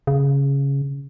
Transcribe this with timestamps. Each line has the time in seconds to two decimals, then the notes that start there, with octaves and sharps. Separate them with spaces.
0.07 C#3